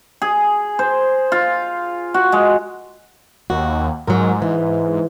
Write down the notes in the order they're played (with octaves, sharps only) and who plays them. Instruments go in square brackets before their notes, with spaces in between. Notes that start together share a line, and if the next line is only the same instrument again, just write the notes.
[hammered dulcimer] G#4
C5
F4
F#4
G#3
[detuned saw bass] D#2 [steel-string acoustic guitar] F#4
[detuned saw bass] G#2 [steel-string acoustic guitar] F#3 A#4
[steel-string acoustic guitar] E3